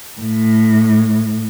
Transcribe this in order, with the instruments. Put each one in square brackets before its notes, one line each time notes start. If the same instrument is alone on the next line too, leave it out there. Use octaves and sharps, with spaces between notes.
[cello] A2